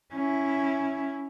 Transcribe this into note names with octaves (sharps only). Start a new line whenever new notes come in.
C#4 E4